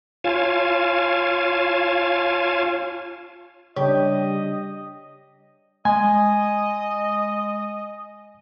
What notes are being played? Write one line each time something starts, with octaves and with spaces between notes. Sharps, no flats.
F4 C#5 F5 G#5 A5
C#3 G3 D4 G4 C#5 D#5
G#3 D#5 G#5